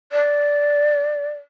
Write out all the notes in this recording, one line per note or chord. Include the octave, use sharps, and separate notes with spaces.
D5